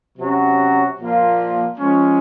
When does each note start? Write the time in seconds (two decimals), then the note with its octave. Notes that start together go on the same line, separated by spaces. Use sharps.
0.18 C3 F#3 C#4 F#4
0.99 A#2 F3 A#3 F4
1.78 F3 G#3 C#4